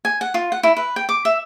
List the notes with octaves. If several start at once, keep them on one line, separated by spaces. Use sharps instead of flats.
G#5
F#5
F4
F#5
E4
B4
G5
D6
E5